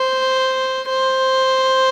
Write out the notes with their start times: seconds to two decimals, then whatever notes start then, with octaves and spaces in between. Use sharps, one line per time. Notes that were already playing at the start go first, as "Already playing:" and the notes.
Already playing: C5
0.89 C5